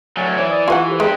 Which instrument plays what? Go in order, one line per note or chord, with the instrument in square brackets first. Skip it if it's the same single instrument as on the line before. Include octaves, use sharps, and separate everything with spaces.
[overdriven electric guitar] F#3 A3 [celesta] G#5 A6 G7
[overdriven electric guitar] E3 [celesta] C5 C#5 E5
[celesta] D5 D#6 A6
[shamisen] F4 B4 F#5 [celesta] E5 G#5 C#6
[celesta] G4 A4 C5
[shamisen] G#3 [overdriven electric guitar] G4 B4 [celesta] D7